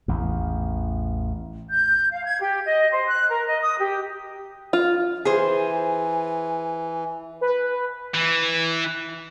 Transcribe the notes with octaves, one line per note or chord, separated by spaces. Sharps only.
A1 E2
G6
F5
G#6
G4
D#5
C5
F#6
A#4
D#5
D#6
G4
F4
E3 G#4 C5 G#5
B4
E3